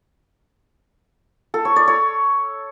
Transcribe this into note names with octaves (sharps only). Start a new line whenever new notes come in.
A4
C#5
D5
C#5